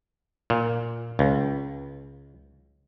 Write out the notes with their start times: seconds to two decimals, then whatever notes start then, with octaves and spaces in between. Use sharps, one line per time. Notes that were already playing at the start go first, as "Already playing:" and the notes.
0.50 A#2
1.19 C#2